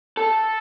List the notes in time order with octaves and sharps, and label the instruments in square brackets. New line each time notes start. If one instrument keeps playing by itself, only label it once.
[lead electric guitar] A4